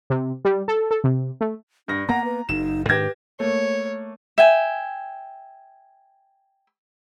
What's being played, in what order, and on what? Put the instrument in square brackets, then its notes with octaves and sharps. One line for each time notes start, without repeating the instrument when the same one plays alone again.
[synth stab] C3
G3
A4
A4
C3
A3
[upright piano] G2 A#6 [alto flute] D4
[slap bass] A#3 B3 [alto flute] F#5 [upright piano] A#5 A#6
[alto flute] B4
[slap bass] F#1 [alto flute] D#4 [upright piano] E7
[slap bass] G#2 D#3 D4 [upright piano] G4 G#6 A#6 [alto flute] B4
[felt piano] A3 A#3 [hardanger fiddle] C#5
[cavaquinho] E5 G5 G#5